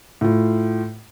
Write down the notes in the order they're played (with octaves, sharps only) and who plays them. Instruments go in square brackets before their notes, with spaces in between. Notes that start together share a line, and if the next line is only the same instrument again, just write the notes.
[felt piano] A2 F4